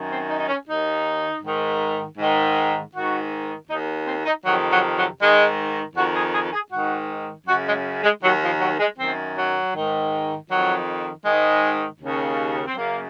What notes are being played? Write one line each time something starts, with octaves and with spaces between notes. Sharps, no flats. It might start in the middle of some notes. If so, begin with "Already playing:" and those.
Already playing: F#2 D#3
C4
D#4
D#4
C#4
D#2 D#3 D#4
G#2 D#3
G#2 D#3
G#2 D#3 F#4
D#2 D#3 D#4
C4
D#4
F2 C3 D#3 F#3
F#3
F#3
G#2 D#3 G#3
F2 D#3 F#4
G#4
G#4
G#4
G#2 D#3 F#4
F#2 C#3 F#4
G#3
G#3
D#2 D#3 F#3
F3
F#3
G#3
F#2 D#3 C4
F#3
G#2 D#3
F2 D#3 F#3
G#2 D#3 G#3
D#2 C#3
C4
F#2 C#3 A#3